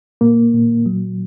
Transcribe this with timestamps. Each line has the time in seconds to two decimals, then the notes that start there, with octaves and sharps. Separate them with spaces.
0.21 A#2 A#3
0.54 A#2
0.86 F#3